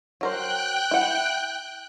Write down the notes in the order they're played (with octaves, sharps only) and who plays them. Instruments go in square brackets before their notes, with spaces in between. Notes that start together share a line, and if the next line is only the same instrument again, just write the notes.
[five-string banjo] F#3 A#4 C5 [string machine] G5 F#6
[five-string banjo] E4 F#5